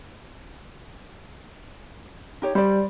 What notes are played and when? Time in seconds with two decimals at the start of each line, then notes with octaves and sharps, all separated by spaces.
2.42 D#4 G4 C#5
2.55 G3 C5 D5